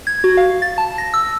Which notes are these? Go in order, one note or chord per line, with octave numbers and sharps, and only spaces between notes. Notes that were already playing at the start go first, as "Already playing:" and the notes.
G#6
F#4
F5
A6
A5
A#6
E6